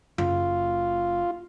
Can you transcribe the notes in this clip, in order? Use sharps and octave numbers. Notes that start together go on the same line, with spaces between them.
F#1 F4